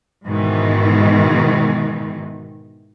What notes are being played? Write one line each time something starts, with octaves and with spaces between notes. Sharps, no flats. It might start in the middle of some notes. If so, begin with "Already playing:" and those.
G#2 B2 D#3 E3